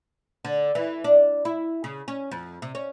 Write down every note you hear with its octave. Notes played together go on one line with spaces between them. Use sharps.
D3
E3
D4
E4
C#3
C#4
F2
C3
C#4